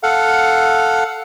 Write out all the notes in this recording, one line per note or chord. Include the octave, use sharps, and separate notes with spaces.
A4 F5 F#5